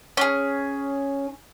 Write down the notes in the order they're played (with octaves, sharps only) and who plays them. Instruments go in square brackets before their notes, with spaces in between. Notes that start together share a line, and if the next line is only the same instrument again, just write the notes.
[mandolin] C#4 G#4